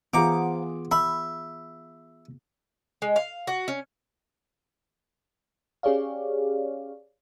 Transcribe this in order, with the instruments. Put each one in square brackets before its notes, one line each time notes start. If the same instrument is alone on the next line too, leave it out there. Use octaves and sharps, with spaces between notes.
[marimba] E3 [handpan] B3 F4 G#4 [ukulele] C5 F#5 A#5 [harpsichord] D6
[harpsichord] E5 [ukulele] B5
[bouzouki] G#3
F5
F#4
C#4
[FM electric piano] C#4 G4 G#4 C#5 D5 F5